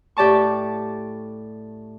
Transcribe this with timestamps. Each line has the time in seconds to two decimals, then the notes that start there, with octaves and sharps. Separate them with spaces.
0.17 A2 G4 D5 A5 C#6